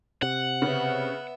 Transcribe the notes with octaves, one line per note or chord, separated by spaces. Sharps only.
C3 F#5
C#3 B3 E5